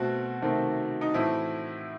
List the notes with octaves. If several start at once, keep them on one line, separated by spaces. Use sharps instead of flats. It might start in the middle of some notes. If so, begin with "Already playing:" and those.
Already playing: B2 A3 C4 F#4
C3 D#3 A3 C4
D#4
A2 E3 A3 C4 E4